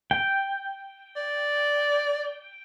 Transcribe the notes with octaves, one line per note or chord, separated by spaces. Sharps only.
G5
D5